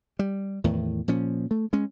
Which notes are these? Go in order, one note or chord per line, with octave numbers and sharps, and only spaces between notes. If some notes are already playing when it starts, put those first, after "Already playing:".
G3
E2 A2 D#3
A#2 F3 C#4
A3
G#3 C#4